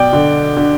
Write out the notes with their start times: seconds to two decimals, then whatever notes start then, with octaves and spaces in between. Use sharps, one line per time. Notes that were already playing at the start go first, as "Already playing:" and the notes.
Already playing: B2 D5 G5
0.13 D3
0.56 D3